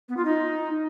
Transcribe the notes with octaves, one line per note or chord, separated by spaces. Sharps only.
B3
F4
D#4